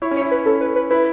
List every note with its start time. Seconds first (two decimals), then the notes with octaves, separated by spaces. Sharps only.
0.02 E4 C#5
0.11 C#4
0.17 C#5
0.21 E4
0.31 B4
0.46 C#4 A4
0.61 B4
0.76 B4
0.90 E4 B4